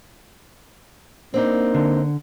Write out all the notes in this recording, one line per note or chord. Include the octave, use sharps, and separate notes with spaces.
A#3 C4 D4 D#4
D3